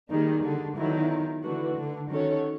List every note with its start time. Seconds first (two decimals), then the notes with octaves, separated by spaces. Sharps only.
0.10 D#3 G3 A#3 D#4 G#4
0.43 D3
0.77 D3 D#3 F#3 B3 E4
1.44 D3 E3 A3 D4 F#4 B4
1.77 D3
2.11 D#3 C#4 F#4 A4 C#5